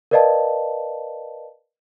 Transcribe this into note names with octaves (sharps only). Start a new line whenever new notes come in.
A#4 B4 D5 D#5 F5 A5